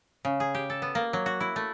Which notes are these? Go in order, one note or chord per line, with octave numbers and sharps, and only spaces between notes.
C#3
G#4
G4
A4
B3
A#3
F#3
F#4
E4
A3